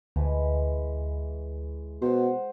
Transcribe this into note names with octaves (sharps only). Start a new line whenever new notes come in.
D2 E3 G#3
B2 C5 F#5